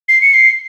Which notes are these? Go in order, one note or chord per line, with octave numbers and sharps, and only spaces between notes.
C7
C#7
C7